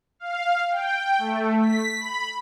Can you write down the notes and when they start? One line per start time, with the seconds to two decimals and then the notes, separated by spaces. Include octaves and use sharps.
0.20 F5
0.71 G5
1.18 A3
1.62 B6
2.00 B5